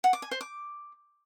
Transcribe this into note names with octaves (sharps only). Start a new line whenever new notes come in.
F#5
D6
G#5
C5
D6